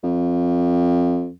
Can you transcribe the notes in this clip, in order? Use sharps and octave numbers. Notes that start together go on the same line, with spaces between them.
F2